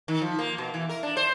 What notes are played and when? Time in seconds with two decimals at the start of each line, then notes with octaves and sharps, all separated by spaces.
0.08 D#3
0.22 F3
0.39 A#3
0.58 B2
0.74 E3
0.89 A#4
1.03 D4
1.17 C5